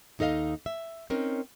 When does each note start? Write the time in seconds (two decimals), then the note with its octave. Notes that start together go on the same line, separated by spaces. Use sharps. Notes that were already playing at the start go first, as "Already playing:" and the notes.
0.19 D#2 D#4 A4 D#5 F5
0.66 E5
1.10 C4 C#4 D#4 A#4